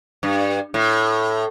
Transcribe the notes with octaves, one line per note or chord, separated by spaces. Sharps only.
G2
A2